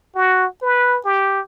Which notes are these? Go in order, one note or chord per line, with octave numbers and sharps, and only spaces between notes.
F#4
B4
G4